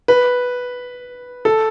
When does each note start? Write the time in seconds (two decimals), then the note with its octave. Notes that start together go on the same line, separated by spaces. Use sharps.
0.08 B4
1.45 A4